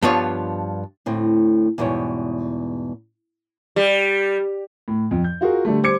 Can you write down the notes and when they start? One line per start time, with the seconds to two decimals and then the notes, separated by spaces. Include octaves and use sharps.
0.02 G2 F3 B3 D4 F4 C#5
1.06 D2 A2 C4
1.78 E2 G#2 B2 G3 C#5
3.76 G3
4.88 A2
5.11 F2
5.24 G6
5.41 F4 F#4 G#4 A#4
5.65 D3 G3 A3
5.83 G3 C5 D6 G#6 C#7